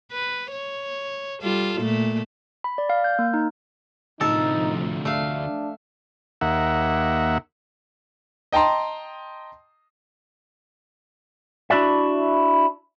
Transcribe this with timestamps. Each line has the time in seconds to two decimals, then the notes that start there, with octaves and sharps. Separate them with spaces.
0.12 B4
0.52 C#5
1.42 G3 F4 A4
1.81 A#2 A3
2.64 B5
2.78 D5
2.89 F5
3.04 G6
3.19 A#3
3.34 D#4
4.21 D2 A2 C3 F3 D#4 A4 A#4
5.05 A3 D4 F5
6.41 D#2 A#3 E5 F#5
8.52 D#5 G5 A5 A#5 C6
11.70 D4 E4 F#4 D5 E5